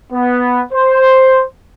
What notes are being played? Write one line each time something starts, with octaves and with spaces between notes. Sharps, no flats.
B3
C5